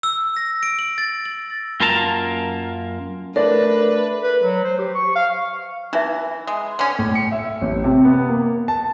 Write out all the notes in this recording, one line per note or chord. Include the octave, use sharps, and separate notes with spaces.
E6
A#6
D7
F#7
A6
F#7
F#2 A#3 F4 A#4 A5 A#5
A3 D4 A#4 B4 D5
B4
F#3
C5
G4
C#6
F5
E3 D#4 E5
G#3
D3 C#4
A2
C#7
E5
A1
C3
B3
A#3
A5